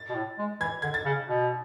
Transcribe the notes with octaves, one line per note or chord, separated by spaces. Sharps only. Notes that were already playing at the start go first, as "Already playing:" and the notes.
Already playing: A6
B2
A2
G#3
E3 G#6
D3 G#6
A6
C#3
B2